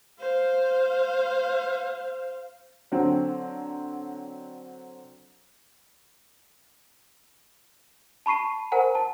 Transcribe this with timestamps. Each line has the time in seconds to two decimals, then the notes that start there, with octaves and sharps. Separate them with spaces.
0.19 C5 F5
2.92 D3 F#3 C4
8.26 A5 B5 C#6 C7 D#7
8.72 A#4 C5 F#5 G#5 A#5
8.95 A5